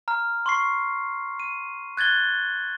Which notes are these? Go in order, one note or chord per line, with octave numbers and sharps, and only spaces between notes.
A#5 F6
C6 C#6 C7
D#7
F#6 G#6 A6 G7